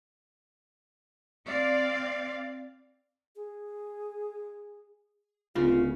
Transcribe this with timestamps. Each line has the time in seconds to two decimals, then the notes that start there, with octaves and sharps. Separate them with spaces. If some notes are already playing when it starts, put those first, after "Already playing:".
1.46 C4 D5 F5
3.36 G#4
5.55 D1 C#3 F4 F#4